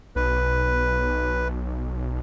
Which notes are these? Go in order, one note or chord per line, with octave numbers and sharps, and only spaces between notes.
B1 B4